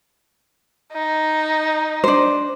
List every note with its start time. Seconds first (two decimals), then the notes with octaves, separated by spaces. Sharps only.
0.93 D#4
2.04 D4 C5